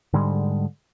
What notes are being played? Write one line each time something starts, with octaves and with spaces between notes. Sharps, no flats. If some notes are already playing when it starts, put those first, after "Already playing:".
G#2 D3 G3 G#3